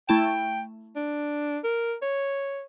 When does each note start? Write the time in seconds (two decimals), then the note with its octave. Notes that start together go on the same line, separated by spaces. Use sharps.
0.09 A3 E4 G5 A5
0.96 D4
1.64 A#4
2.02 C#5